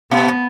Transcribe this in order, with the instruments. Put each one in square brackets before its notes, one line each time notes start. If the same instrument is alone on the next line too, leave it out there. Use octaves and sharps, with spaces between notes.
[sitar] B2 [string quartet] B3